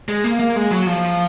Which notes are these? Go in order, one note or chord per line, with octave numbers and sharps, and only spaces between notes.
G#3
A#3
A#3
G#3
F#3
F3